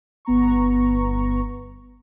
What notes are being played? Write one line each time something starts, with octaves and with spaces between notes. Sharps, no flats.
G1 B3 A#5 C#6